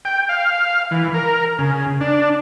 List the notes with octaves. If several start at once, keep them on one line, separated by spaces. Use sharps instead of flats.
G5
F5
E3
A#4
C#3
D4